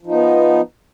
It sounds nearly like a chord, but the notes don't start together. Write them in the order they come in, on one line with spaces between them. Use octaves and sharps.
F3 D#4 B3